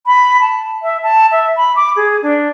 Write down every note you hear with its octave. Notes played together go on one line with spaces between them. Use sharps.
B5
A5
E5
A5
E5
B5
D6
G#4
D4